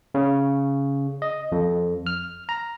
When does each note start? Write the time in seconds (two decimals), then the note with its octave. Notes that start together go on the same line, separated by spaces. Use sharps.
0.15 C#3
1.22 D#5
1.52 F2
2.07 F6
2.49 A#5